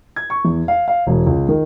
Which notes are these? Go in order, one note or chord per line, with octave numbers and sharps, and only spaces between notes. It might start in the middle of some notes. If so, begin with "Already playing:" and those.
G#6
C#6
E2
F5
F5
E1
C#2
D#3